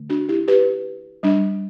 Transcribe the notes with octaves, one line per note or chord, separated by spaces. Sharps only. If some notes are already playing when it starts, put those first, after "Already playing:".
Already playing: D3 A3
D4 F#4
E4 G4
G4 B4
G3 D4